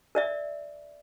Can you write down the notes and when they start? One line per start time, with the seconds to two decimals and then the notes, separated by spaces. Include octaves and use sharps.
0.15 A#4 D5 E5